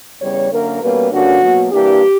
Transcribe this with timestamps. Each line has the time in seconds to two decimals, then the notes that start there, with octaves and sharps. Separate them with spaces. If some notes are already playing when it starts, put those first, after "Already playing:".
0.21 E2 C#3 G3 C#5
0.51 F#2 D3 A#3 A#4
0.81 B2 G3 A#3 C#4 B4
1.11 G2 D3 A#3 C#4 F#4
1.41 B2 F#3 A#3
1.70 G2 E3 A#3 D4 G4